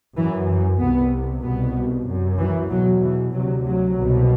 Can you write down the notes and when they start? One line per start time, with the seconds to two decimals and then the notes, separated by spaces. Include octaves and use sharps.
0.16 F#2 E3
0.48 E3
0.80 C2 C3 B3
1.43 C2 B2 B3
2.06 F#2
2.38 E3
2.70 E2 B2 F#3
3.02 E3
3.33 D2 C3 F#3
3.65 F#3
3.97 C2 B2